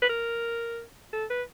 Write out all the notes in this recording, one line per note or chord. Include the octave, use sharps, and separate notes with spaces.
B4
A#4
A4
B4